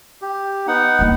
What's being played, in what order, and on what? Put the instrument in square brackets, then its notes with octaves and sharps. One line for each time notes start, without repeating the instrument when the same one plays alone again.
[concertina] G4
B3 D#4 F#5
[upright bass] D#1 A#3